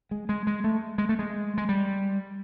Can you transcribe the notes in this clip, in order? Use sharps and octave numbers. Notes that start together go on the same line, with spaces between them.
G#3
G#3
G#3
A3
G#3
A3
G#3
G#3
G3